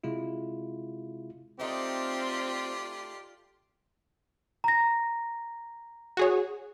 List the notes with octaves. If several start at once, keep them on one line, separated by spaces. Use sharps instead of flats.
C3 G#3 E4 F4
A3 C4 D#4 F4 G4 D5
A#5 A#6
F#4 G#4 C#5